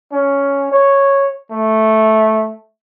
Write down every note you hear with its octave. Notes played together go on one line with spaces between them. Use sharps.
C#4
C#5
A3